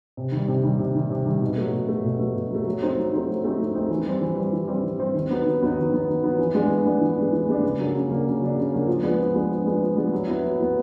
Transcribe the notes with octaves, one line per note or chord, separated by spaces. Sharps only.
C3
D#3 G3
C3
D#3 G3
C3
D#3 G3
C3
D#3 G3
B2
F#3 A3
B2
F#3 A3
B2
F#3 A3
B2
F#3 A3
F#3
A3 C4 D#4
F#3
A3 C4 D#4
F#3
A3 C4 D#4
F#3
A3 C4 D#4
E3
G3 C4
E3
G3 C4
E3
G3 C4
E3
G3 C4
D#3
F#3 B3 D#4
D#3
F#3 B3 D#4
D#3
F#3 B3 D#4
D#3
F#3 B3 D#4
E3
G#3 B3 D4
E3
G#3 B3 D4
E3
G#3 B3 D4
E3
G#3 B3 D4
C#3
F#3 A#3 D4
C#3
F#3 A#3 D4
C#3
F#3 A#3 D4
C#3
F#3 A#3 D4
F3
G#3 B3 D4
F3
G#3 B3 D4
F3
G#3 B3 D4
F3
G#3 B3 D4
F#3
B3 E4
F#3
B3 E4